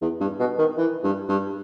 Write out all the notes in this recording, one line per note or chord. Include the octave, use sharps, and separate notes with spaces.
E2
G2
B2
D#3
E3
G2
G2